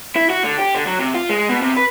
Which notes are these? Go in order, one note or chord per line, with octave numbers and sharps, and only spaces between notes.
E4
F#4
D3
G4
D3
F#3
C3
F4
G#3
B2
C3
B4